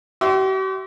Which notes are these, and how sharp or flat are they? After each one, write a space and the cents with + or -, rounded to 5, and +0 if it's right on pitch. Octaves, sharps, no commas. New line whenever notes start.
G4 -45 E5 +0 C6 +0